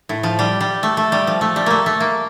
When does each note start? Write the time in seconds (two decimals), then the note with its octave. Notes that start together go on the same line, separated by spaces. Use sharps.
0.09 A2
0.23 F3
0.39 G3
0.61 G3
0.83 A3
0.97 A3
1.12 G3
1.27 F3
1.41 A3
1.56 G3
1.66 A3 A#3
1.86 A3
2.00 A#3